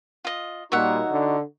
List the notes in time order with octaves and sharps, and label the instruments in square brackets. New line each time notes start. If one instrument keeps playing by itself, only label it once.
[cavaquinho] F4 D#5
[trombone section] A#2 G3 A#3 [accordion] D#4 F#4 [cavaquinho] C#5 E5 F#5
[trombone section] D3